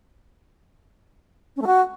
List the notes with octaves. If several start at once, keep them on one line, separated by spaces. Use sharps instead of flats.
C#4
A3
F#4